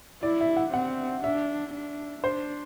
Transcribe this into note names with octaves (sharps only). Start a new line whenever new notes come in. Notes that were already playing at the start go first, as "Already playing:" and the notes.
E4 D5
E5
F#5
C4 F#5
D4 E5
D4
D4 C5